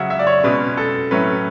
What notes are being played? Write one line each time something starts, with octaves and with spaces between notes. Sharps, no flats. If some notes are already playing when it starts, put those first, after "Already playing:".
Already playing: C#3 F#3 C#4 E5 F#5
E5
D5
C#5
B2 G#3 C#4 B4
A4
A2 F#3 A3 C#4 B4